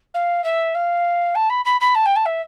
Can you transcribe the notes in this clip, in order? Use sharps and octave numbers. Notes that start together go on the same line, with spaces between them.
F5
E5
F5
A5
B5
B5
B5
A5
G5
A5
E5